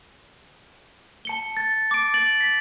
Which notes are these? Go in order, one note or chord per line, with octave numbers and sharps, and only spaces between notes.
A5 C#7 G7
A6
D6 D7
A6 D7 F#7
B6